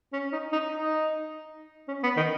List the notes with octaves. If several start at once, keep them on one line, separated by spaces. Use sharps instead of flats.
C#4
D#4
D#4
D#4
C#4
B3
D#3